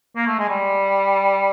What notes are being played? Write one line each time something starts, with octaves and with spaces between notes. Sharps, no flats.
A#3
A3
G#3
G3